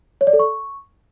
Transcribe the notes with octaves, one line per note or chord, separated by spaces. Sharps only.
C#5
D5
A4
C#6